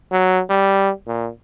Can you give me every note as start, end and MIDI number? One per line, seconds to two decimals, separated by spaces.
0.12 0.41 54
0.50 0.90 55
1.08 1.29 46